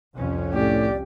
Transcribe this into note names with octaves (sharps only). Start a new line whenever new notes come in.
C2 F2 C#4
A2 G4 D5